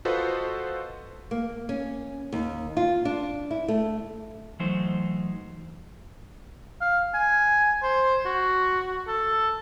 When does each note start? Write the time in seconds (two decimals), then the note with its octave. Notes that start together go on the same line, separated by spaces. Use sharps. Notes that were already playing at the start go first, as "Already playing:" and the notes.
0.05 F4 F#4 A4 B4 C5 D#5
1.31 A#3
1.69 C#4
2.32 D#2
2.77 F4
3.05 D4
3.51 E4
3.68 A3
4.60 E3 F#3 A3 D#4 C5
6.81 F5
7.14 G#5
7.83 C5
8.26 F#4
9.08 A4